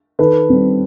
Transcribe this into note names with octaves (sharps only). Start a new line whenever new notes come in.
D#3 A4 B4
G3 C4